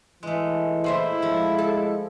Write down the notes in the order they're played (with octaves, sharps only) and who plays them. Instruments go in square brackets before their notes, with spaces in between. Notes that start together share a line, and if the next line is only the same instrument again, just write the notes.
[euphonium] E3 [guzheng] G#3 A3
[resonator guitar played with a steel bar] A#2 C5 E5 [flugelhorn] E4
[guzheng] F3 [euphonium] G#3
[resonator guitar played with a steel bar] A4